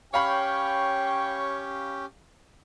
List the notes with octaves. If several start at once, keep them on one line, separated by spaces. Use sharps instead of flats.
C#4 G4 C#5 F5 G5 B5